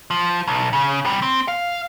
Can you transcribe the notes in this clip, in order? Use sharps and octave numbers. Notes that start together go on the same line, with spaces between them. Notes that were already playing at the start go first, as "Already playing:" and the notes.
F3
B1
C#3
C3 G3
C4
F5